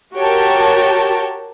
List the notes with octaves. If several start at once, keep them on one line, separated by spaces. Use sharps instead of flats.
F#4 G4 A#4 C#5 G5 A5